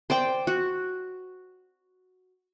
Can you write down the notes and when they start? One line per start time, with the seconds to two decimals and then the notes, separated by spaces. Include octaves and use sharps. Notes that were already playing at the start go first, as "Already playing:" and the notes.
0.10 C5 D5 G5
0.47 F#4